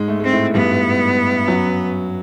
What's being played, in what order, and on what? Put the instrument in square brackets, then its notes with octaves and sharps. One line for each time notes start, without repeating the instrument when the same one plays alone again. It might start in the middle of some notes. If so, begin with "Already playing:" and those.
Already playing: [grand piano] G#2 G#3
A3
[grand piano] G#3 [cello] C4
[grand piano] A2 A3
[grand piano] G2 G3 [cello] B3
[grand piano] F#2 F#3